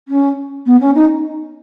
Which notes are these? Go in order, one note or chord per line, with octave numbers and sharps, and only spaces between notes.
C#4
B3
C#4
D#4